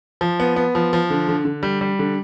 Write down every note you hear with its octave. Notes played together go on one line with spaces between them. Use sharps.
F3
B3
B3
F3
F3
D3
D3
D3
G3
G3
D3